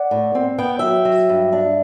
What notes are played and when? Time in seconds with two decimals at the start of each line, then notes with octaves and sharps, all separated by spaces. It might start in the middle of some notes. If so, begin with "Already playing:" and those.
Already playing: D5 F#5
0.11 A2
0.35 C4
0.58 B3 G5
0.79 F#3 E5 G5
1.05 F#3
1.29 G2
1.52 D4